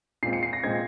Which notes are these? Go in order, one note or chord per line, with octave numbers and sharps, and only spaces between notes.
A#2 G#3 C4 C7
C#7
C7
A#6
A#2 G#3 C4 G#6